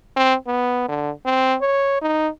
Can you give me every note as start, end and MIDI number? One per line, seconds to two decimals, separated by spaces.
0.17 0.35 60
0.47 0.85 59
0.89 1.11 50
1.26 1.57 60
1.61 1.99 73
2.02 2.29 63